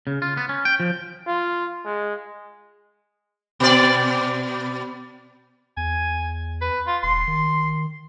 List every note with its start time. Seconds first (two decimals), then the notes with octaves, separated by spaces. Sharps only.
0.07 C#3
0.22 F4
0.37 B3
0.49 C#4
0.65 G5
0.80 F3
1.27 F4
1.85 G#3
3.60 B2 D5
5.77 E2 G#5
6.61 B4
6.87 F4
7.03 D#1 C6
7.27 D#3